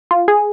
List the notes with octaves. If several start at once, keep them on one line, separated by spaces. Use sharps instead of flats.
F4
G#4